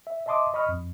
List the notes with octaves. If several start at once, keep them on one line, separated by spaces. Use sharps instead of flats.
E5
D#5 E5 A5 C6 D6 D#6
D#5 B5 C#6 D#6 F6
F2